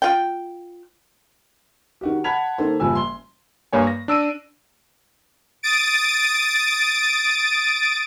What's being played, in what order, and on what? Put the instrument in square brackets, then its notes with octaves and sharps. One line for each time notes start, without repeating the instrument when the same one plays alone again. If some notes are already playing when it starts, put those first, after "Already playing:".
[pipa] F4 G5
[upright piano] D#3 F#4 G4
F#5 A5 B5 G#6 B6 F7
D#3 A#3 A4 C5
F#1 F3 G3 G#5 E6
C6 G7
[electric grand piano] G2 A#3 C#5 G#5
A#6
D4 E6 D7 D#7
[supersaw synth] D#6 A6 D7